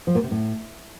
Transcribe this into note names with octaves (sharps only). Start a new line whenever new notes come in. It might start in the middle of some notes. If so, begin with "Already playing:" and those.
F3
A#2
C3
A2